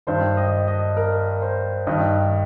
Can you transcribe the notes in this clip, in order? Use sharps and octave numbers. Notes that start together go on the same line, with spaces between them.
G2 D#3 C5
D#5
D#5
A#4
C5
G2 D#3 D#5